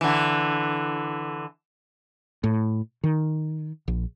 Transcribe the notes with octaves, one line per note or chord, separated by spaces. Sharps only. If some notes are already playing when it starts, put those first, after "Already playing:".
D3 E3
A2
D#3
A#1